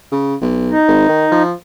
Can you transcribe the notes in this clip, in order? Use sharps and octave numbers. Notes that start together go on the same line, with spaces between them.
C#3
B1
D#4
G#1
D#3
F3